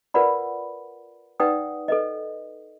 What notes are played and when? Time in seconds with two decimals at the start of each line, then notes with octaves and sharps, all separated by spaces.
0.14 F4 A#4 B4 D5 F#5 B5
1.40 D#4 B4 D5 F#5 G5 D#6
1.88 A4 B4 D#5